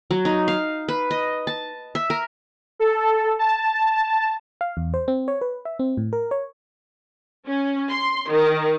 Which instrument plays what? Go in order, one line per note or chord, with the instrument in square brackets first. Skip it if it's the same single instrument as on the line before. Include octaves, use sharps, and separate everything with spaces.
[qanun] F#3
D#4
F5
B4
D#5
A5
E5
A#4
[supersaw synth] A4
A5
[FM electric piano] F5
E2
C5
C4
C#5
B4
E5
C4
A2
A#4
C#5
[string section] C#4
C6
D#3